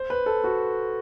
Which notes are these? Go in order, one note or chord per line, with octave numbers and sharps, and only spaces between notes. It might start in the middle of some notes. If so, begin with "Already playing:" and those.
Already playing: C5
B4
A4
F#4